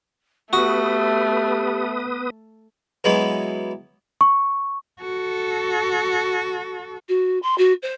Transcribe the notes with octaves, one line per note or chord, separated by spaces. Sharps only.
A3 B3 F#4 G4 B4 D#6
E3 F#3 G#3 B3
C#6
F#4 A4
F#4
C6
F#4
C5